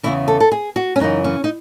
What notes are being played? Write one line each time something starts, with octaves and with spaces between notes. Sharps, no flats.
E2 C#3 E3 E4
A4
A4
G#4
F#4
C#4
F#2 C#3 E3 D#4
C#4
D#4